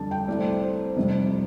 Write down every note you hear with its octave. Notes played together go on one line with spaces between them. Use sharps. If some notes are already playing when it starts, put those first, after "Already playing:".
Already playing: F2 D3 G3 A5
G5
C2 C3 A3 D5
C5
C5
F1 F2 C3 G3